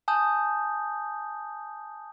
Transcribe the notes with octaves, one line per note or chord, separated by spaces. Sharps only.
G#5 A5 D#6 G6